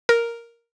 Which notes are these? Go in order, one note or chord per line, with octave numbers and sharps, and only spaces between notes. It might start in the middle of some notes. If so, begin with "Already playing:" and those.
A#4